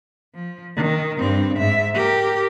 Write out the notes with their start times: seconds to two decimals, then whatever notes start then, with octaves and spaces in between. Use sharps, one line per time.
0.34 F3
0.76 D#3
1.19 G2 C4
1.59 G#2 E5
1.94 G4 A#4